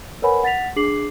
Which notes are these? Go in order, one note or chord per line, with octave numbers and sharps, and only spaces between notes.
A#4 B4 C#5 F#5 G#5 B5
F#5 A6 B6 F7
D4 G#4 D6 C7 F#7